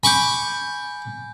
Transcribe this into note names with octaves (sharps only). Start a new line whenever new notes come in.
G#5 B5 C#6 D6 G6